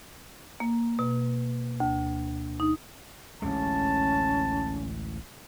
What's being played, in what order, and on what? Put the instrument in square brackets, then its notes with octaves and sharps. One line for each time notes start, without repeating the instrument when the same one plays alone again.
[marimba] A#3
B2
D2
D#4
[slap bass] A1 D2 G#3 [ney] C#4 [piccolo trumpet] A5